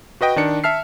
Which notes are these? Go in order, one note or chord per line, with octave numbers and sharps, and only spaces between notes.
F#4 B4 D#5 G5
D#3 D4 C#7
E5 A5 F6 C7